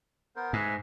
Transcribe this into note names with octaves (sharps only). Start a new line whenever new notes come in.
B3 A#4 C5
G#2 B4 E5 G#5